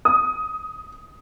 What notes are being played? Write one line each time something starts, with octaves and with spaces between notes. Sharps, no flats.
D#6